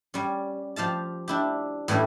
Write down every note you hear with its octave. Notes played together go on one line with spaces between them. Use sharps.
G3 C#4
F3 G4 F5 A5
D4 E4 G4
A2 E3 G3 C#4 E4